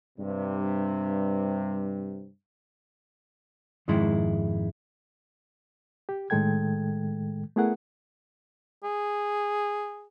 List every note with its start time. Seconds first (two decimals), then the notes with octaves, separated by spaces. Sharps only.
0.17 G2 C3
3.88 F2 G#2 D#3 G#3 E4
6.09 G4
6.30 A2 D#3 G#3 A4 G5 G#6
7.56 A3 B3 E4 G#4 A#4 F#5
8.83 G#4